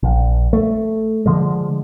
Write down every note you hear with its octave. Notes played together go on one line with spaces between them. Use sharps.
A#1
A3
D3 F3 G#3